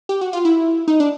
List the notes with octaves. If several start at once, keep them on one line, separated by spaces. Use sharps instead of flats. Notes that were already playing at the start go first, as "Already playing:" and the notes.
G4
F#4
F4
E4
D#4
D4